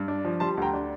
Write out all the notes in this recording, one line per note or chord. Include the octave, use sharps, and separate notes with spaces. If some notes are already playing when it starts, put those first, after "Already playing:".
Already playing: G2
D4
F3
G3 A5 C6
D2 G5 A#5
D4